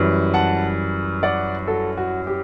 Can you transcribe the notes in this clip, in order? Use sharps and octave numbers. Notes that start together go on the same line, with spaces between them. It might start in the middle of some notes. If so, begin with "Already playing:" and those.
Already playing: F#2 E3 G3
F#5 A5
D5 F#5
F#4 A4
F#4
G4